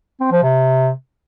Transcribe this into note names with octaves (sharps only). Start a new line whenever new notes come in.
C4
F3
C3